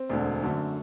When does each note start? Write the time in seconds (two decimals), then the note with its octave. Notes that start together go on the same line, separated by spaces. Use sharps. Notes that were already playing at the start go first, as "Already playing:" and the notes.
Already playing: C4
0.09 E1 D2 D3
0.42 F#2 D3 A3